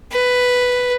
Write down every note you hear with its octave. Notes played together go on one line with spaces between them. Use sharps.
B4